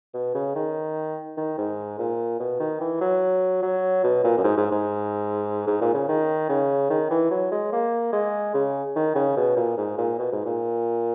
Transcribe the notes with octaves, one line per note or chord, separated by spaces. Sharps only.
B2
C#3
D#3
D#3
G#2
A#2
B2
D#3
E3
F#3
F#3
B2
A#2
F#2
G#2
G#2
G#2
G#2
A#2
C#3
D#3
C#3
D#3
E3
F#3
G#3
A#3
G#3
C#3
D#3
C#3
B2
A#2
G#2
A#2
B2
G#2
A#2